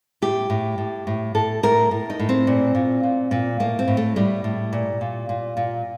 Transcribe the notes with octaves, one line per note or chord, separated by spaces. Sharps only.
A2 G4
A2
A2
A2
A2 A4
A2 A#4
A2
D#4
A2
C4
A#2
A#2
A#2
A#2
A2 A#3
C4
A2
A3
A2 G3
A2
A#2
A#2
A#2
A#2